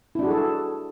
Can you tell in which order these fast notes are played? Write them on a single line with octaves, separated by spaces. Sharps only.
E4 D4 F#4 G#4 A4